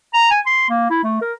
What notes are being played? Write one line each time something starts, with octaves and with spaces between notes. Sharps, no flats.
A#5
G#5
C6
A#3
E4
A3
A#4